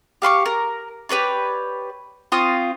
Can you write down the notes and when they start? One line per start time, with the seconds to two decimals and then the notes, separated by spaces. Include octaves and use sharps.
0.22 G4 F5 C6 C#6
0.46 A#4
1.09 G4 B4 C#5 D5
2.32 C4 F4 C#6 D#6